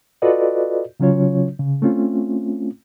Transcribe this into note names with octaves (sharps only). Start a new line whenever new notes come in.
F4 F#4 A4 B4 D5 D#5
C#3 F#3 C#4 F4 C#5
C#3
A3 C4 C#4 F4